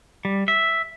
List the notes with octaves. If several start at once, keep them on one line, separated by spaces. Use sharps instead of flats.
G3
E5